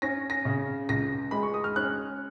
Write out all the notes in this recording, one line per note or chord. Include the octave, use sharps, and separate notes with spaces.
C#4 A#6
A#6
C#3
C#2 A#6
G#3 B5
C#6
D#6
F6
C#4 F#6